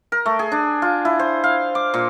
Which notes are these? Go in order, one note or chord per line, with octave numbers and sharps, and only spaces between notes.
A#4
A3
G#4
D4
F4
E4
C5
F5
D6
A#2